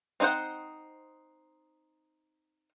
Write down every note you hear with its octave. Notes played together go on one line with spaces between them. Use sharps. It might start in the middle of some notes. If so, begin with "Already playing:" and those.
C4 D#4 F#4 C5 F#5